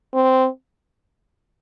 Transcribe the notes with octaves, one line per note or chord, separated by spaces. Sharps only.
C4